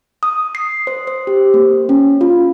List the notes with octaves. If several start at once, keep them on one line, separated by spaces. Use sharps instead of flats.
D#6
C7
C5
C5
G4
A#3
C#4
F4